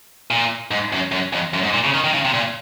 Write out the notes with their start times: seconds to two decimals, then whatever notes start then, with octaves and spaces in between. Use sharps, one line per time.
0.31 A#2
0.71 G#2
0.92 F#2
1.12 F#2
1.33 F2
1.54 F#2
1.63 G#2
1.73 A#2
1.84 C#3
1.94 D#3
2.04 D#3
2.14 C#3
2.25 C3
2.34 A#2